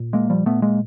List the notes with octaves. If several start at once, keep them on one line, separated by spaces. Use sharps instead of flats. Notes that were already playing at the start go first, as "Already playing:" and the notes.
Already playing: A#2
G#3 A#3
F3 G3
A#2 A3 B3
G#3 A#3